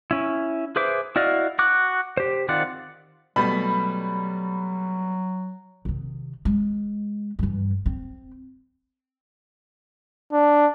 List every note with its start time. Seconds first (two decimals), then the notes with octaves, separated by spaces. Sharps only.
0.11 C#4 E4
0.76 G#4 B4 C5 E5 D6
1.16 E4 F#4 D5 D#5 F5
1.59 F#4 D6 F#6
2.17 G4 C5
2.49 D#3 C4 F4 D5 F#5
3.36 B2 F#3 G3 A3 B5
5.85 C3 D#3
6.45 G#3
7.39 G2 E3
7.86 C4
10.32 D4